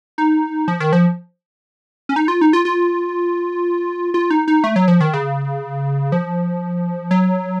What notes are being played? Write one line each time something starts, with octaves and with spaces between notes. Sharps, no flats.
D#4
F3
D#3
F3
C#4
D#4
F4
D#4
F4
F4
F4
D#4
D#4
A3
F#3
F3
D#3
C#3
F3
F#3